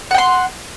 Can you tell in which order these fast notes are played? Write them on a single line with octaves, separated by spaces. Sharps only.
F#5 G5 C6